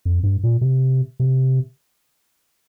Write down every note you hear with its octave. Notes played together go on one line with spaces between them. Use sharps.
F2
G2
A#2
C3
C3